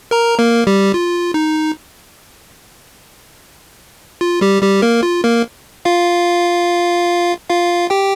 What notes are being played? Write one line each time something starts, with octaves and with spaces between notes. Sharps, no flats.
A#4 A#5
A#3 A#4
G3 G4
F4
D#4
F4
G3 G4
G3 G4
A#3 A#4
F4
A#3 A#4
F4 F5
F4 F5
G4 G5